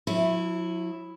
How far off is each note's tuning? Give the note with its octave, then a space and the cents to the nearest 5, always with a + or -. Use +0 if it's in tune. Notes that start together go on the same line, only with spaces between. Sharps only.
F#3 -40 E4 +0